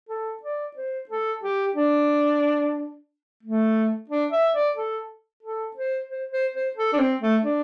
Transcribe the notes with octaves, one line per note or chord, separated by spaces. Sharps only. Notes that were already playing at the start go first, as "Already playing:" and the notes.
A4
D5
C5
A4
G4
D4
A3
D4
E5
D5
A4
A4
C5
C5
C5
C5
A4
D4
C4
A3
D4